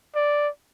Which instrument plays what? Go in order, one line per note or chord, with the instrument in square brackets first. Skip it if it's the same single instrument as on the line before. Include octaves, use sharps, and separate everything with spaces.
[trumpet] D5